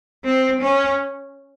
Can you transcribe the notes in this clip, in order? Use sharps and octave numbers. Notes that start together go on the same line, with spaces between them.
C4
C#4